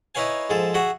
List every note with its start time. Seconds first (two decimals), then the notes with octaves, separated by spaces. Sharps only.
0.15 D#4 E4 B4 C#5 F5 G#5
0.50 G#2 F3 G#4 A4
0.74 F#4 G#4 E5 F#5